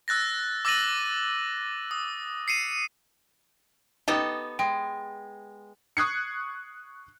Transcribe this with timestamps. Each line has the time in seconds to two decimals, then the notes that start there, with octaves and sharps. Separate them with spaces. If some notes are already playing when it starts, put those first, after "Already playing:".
0.08 E6 F#6 A6 A#6
0.65 D6 E6 A6 A#6 D#7 F#7
1.91 D#6
2.48 C7 C#7 D#7 E7
4.08 B3 D#4 G4 A4 D#5
4.59 G#3 G5
5.97 C#6 D#6 F#6 G#6 C7 C#7